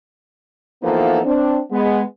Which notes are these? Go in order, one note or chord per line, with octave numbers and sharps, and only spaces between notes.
E3 F3 A#3 B3 D#4 A4
C4 D4
G#3 B3